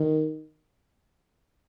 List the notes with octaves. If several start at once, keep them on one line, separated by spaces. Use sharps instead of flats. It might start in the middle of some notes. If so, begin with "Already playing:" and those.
Already playing: D#3